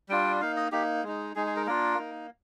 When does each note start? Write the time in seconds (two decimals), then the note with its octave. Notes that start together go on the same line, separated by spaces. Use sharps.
0.09 G3 D4 F4 G5
0.41 A#3 D#4 F5
0.57 D#5
0.72 A#3 D#4 G4
1.03 G#3 D#4
1.36 G#3 D#4 G#4
1.47 G#4
1.56 A#4
1.66 A#3 D4 F4 A#4
1.99 A#3 D#4